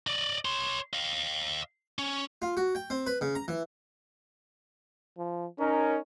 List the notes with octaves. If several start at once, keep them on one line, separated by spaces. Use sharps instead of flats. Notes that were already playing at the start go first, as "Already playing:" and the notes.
D5 D#5
C#5 C6
D#5 F5
C#4
F4
F#4
G5
C4
B4
C#3
A#5
E3
F3
C#4 D#4 A#4